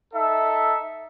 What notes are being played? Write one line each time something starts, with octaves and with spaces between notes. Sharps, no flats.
D#4 A4 E5